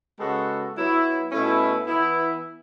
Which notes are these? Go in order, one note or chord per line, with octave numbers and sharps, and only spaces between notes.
C#3 G#3 B3 F#4 A4
F#3 B3 E4
B2 A3 C#4 E4
E3 B3 E4